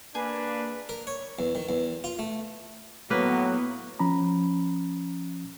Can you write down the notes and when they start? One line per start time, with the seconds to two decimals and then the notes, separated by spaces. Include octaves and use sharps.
0.15 A#3 D4 G#4 B4
0.89 A#4
1.07 C#5
1.39 E2
1.55 D#3
1.69 E2
2.04 F4
2.19 A3
3.10 A2 F#3 A#3 B3 B4
3.99 F3 C#4 A#5 B5